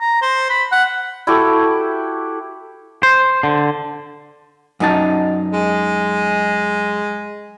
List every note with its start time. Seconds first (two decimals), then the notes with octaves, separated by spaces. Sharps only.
0.01 A#5
0.22 C5
0.50 B5
0.72 F#5
1.27 E4 F#4 G4 A4
3.03 C5
3.43 D3
4.80 F#2 D#4 A5
5.53 G#3